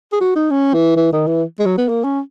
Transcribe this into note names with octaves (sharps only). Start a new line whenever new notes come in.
G#4
F#4
D#4
C#4
E3
E3
D#3
E3
G#3
F#3
B3
A#3
C#4